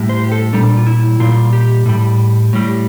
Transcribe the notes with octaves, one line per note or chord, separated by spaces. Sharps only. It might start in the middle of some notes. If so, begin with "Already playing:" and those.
Already playing: A2 G3
C5
G4
A4
A#2 G3 D4
F4
E4
A#2 G3 F4
G4
A2 G3
A2 G3